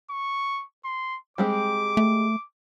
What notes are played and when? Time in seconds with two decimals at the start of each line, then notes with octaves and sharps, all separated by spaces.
0.10 C#6
0.85 C6
1.38 G3 G#3 C4 D6
1.97 A3